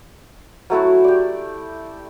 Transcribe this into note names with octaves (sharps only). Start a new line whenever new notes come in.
F#3 A3 E4 F#4
G4 D5